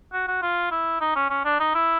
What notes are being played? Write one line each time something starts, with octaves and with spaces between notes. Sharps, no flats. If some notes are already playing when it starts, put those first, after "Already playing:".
F#4
F#4
F4
E4
D#4
C#4
C#4
D4
D#4
E4